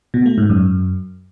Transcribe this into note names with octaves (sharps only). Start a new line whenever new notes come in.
B2
A3
G#2
F#2